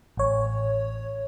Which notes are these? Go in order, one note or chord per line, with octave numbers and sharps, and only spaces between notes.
A1 C#5